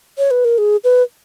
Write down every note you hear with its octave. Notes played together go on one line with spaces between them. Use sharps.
C#5
B4
A#4
G#4
B4